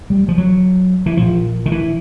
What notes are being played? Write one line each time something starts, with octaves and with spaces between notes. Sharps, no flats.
G3
F3
F#3
E3
A#2 F3
D#3
E3